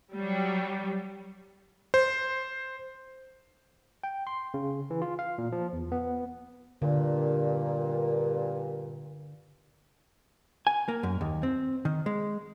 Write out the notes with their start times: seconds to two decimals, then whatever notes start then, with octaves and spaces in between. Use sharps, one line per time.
0.16 F#3 G3
1.94 C5
4.04 G5
4.27 C6
4.54 C#3
4.91 E3
5.02 F4
5.19 F5
5.38 A#2
5.52 F3
5.73 E2
5.92 B3
6.82 G2 A#2 D3
10.67 G#5
10.88 A#3
11.03 F#2
11.21 D#2
11.43 C4
11.85 D#3
12.06 G#3